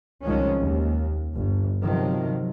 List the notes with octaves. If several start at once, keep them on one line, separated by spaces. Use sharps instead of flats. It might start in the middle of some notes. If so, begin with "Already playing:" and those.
C2 D#3 F3 G#3 C#4
D#2
G1
C3 D#3 F3 F#3